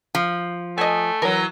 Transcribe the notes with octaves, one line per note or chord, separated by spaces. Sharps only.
F3
A3 D#5 G#5
E3 F#3 A#4